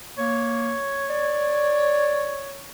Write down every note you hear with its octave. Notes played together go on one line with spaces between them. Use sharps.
A#3 C#5
D5